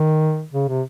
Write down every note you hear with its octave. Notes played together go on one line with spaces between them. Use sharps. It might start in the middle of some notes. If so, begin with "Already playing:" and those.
Already playing: D#3
C#3
C3